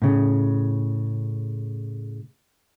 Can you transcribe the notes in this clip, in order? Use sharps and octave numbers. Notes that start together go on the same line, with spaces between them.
A2 C#3